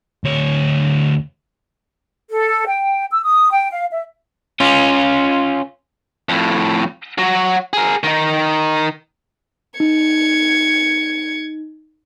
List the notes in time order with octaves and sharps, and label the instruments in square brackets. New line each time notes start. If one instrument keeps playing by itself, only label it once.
[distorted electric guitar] D2 C#5
[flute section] A4
G5
E6
D#6
G5
F5
E5
[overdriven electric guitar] C#4 F4
[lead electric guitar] F2 A2
F#3 F#4
G#4 A#4
D#3 D#4
[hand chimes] D#4 [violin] G#6 C#7